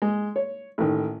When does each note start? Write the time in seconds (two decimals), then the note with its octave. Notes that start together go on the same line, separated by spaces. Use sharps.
0.02 G#3
0.36 C#5
0.78 A1 D#3